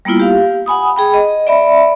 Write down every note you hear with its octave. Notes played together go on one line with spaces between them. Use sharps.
G3 A#3 B3 E4 F4
G4 F5
F#5 G#5 B5 D#6
G#4 G5 B5
D#5
D5 E5 B5